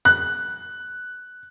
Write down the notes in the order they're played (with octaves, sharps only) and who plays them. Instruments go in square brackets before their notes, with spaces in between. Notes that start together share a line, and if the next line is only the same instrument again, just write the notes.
[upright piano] F#6